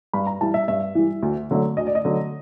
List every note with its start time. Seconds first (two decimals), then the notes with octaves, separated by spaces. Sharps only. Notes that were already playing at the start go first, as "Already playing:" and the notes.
0.13 G2 B5
0.27 A#5
0.41 E3 G3 A5
0.54 E5
0.68 G2 E5
0.95 E3 G3
1.22 D2
1.51 D3 F#3 A3
1.77 D2 D#5
1.87 D5
1.95 D#5
2.05 D3 F#3 A3